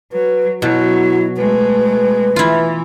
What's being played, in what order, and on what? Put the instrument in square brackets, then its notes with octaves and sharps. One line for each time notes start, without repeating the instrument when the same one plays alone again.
[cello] F#3 [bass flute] B4
[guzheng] B2 [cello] F#3 [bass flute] E4
[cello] G#3 A3 [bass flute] B4
[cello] E3 [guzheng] E4 F4